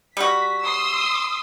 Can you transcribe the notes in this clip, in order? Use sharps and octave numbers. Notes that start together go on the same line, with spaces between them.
G3 F#4 B6
C6 D#6 E6